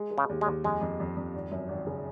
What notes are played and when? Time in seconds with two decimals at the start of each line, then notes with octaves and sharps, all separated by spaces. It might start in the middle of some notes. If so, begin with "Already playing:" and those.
Already playing: G#3
0.11 G#3
0.18 C#3
0.29 D#2
0.41 G#3
0.46 D#2
0.64 F2 G#3
0.81 F2
1.00 F2
1.17 F2
1.34 G#1
1.51 F#2
1.69 G#1
1.87 C#3